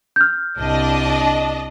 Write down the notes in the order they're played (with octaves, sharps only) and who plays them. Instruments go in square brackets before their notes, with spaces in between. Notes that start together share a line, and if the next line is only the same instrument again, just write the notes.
[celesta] F6 G6
[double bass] C2 [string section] D4 D#5